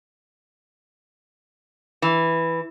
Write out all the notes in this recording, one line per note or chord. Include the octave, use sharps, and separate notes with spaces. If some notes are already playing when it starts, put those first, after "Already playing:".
E3